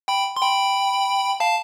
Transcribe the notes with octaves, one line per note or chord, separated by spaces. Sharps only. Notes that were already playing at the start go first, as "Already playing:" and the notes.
G5 B5
C6
G5 B5
F5 A5